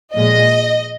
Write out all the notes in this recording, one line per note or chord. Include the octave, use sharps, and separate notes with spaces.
A#2 F3 G#3 D#5